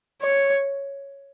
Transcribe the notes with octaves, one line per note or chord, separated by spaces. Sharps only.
C#5